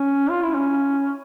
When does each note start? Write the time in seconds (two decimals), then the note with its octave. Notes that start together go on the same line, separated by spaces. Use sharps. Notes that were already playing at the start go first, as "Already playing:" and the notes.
Already playing: C#4
0.30 F4
0.42 E4
0.54 C#4